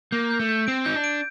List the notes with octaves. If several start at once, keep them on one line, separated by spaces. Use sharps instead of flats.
A#3 G6
G6
A3
G6
C4 D7
D#4 G6
D4
D7